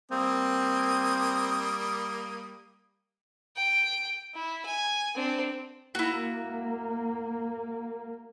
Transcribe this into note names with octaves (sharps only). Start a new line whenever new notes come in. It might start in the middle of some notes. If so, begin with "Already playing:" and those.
G3 A#3 C4 D#6
G5
E4
G#5
C4 D4
A#3 E4 F#4